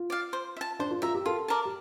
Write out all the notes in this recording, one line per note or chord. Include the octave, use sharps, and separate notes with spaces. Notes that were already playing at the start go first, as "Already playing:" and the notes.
Already playing: F4
D5 F5
C5
E5
A5
D4 C5
F4
F4 E5 A#5
G4
F4 A4
A#4 D5 A5
G4